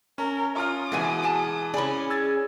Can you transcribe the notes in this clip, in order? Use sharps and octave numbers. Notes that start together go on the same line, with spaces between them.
C#4 A#4
C#4 F4 D#6 F6
B2 E3 G#3 F#4 D5 E5 G#5
G#4 G#5 A5
C#4 E4 G#4 D5 B5
E6 G#6 A6